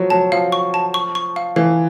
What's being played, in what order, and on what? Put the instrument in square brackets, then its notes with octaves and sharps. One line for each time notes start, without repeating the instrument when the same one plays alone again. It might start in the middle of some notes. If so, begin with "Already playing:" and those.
Already playing: [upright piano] F3 F#3
[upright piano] F#3 [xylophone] A5
[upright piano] F3 [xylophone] F5
[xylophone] C#6
A5
C#6
C#6
F5
[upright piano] E3 [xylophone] F5